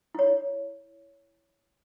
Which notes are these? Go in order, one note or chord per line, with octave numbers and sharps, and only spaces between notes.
E4 C#5